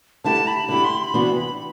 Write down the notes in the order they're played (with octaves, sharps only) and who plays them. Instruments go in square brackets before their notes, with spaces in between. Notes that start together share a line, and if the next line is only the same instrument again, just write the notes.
[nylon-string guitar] D3 A3 E4 G4 [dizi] A5
[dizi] B5
[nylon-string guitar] D3 A3 E4 G4 [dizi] B5
[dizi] C6
C6
B5
[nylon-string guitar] C3 E3 B3 D4 F#4